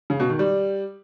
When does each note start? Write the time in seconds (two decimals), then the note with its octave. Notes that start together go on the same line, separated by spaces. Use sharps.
0.10 C#3
0.20 B2
0.29 D#3
0.39 G3